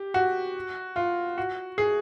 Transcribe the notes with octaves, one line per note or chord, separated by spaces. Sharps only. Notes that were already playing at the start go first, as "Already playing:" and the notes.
Already playing: G4
F#4
F4
F#4
G#4